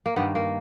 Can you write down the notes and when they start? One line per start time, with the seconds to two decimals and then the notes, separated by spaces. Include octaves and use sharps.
0.06 A#3
0.16 G2 D#3 A#3 B3
0.35 A#3